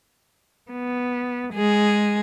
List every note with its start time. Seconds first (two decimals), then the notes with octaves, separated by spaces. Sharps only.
0.70 B3
1.54 G#3 G#4